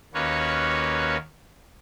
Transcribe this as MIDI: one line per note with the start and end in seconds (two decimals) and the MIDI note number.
0.14 1.17 39
0.14 1.17 58
0.14 1.17 61
0.14 1.17 66
0.14 1.17 71
0.14 1.17 73